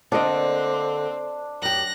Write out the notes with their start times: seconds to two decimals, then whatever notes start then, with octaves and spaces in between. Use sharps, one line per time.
0.12 D3 A#3 C4 D4 D5 D#5 C6
1.62 F#2 G4 F#6 A#6